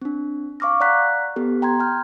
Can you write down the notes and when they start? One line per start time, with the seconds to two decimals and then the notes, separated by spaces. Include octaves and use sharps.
0.02 C4 D4
0.60 F5 C#6 D6 F6 A#6
0.80 D5 F#5 A#5 F#6 B6
1.36 B3 G4 A4
1.62 G5 A#5 C6 G#6
1.80 G5 F6 G6